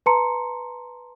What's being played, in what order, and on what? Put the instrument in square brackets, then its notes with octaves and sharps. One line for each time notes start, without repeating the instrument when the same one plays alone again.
[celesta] B4 A5 A#5 C6 C#7